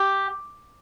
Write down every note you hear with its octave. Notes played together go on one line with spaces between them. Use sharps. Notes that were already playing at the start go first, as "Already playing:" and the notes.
Already playing: G4